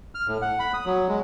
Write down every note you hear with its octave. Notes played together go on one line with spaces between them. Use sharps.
F6
A2
F#5
B5
D#6
F#3
G#3